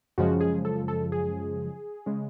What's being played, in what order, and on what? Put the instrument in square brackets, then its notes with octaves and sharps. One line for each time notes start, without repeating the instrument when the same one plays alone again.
[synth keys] F#2 C#3 F3 G#3 F#4
G#4
A4
A4
G#4
C#3 G#3